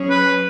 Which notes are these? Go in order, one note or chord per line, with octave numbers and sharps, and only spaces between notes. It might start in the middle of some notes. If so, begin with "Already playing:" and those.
Already playing: F#3 C#4 G#4 C#5
B4